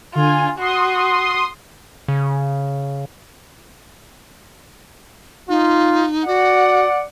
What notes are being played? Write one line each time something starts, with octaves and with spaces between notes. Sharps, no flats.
D3 F4 G#5
F#4 C6 D#6
C#3
D#4 F4
F#4 D5 F#5